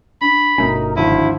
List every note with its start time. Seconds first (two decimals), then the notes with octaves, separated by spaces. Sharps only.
0.21 D4 B5
0.58 G1 B2 A3 C#4 D#4 A#4
0.96 G#1 D2 F3 D4 E4 F#4 D#7